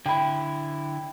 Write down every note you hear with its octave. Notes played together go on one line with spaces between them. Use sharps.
D3 E4 G5 B5